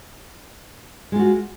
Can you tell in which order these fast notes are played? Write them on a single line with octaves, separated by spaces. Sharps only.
G#3 F4 F#4